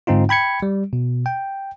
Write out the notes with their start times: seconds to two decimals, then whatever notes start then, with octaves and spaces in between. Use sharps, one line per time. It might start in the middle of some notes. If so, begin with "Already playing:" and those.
0.07 G#2 D3 C4 D#4 F4
0.29 G5 B5 G#6 C#7
0.62 G3
0.93 B2
1.26 G5